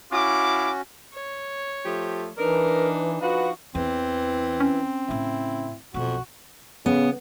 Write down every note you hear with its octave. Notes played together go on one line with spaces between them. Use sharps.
C#4 E4 F#4 F5 D6
C#5
F3 A3 G4
E3 D4 D#4 A#4 B4
F3 F#4 B4 F5
E2 E3 C4
C#4
A2 C#3 E4
B1 F2 B2 F#4
C#3 B3